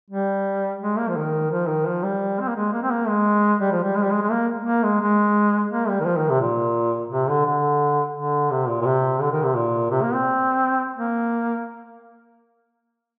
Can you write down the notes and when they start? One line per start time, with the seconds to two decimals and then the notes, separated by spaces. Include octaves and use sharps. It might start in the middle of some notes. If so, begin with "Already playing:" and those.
0.11 G3
0.81 G#3
0.98 A#3
1.09 F3
1.16 D#3
1.51 F3
1.68 D#3
1.86 F3
2.03 G3
2.40 C4
2.48 A#3
2.56 G#3
2.73 A#3
2.83 C4
2.91 A#3
3.08 G#3
3.61 G3
3.72 F3
3.84 G3
3.96 G#3
4.03 G3
4.11 G#3
4.22 G#3
4.31 A#3
4.65 A#3
4.83 G#3
5.01 G#3
5.71 A#3
5.89 G3
6.00 D#3
6.06 F3
6.17 D#3
6.29 C3
6.41 A#2
7.11 C3
7.28 D3
7.46 D3
8.16 D3
8.51 C3
8.68 A#2
8.82 A#2
8.86 C3
9.21 D3
9.32 D#3
9.44 C3
9.55 A#2
9.91 C3
10.02 A#3
10.14 C4
10.96 A#3